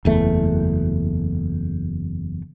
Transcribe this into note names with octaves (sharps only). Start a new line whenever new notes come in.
F#1 E2 A3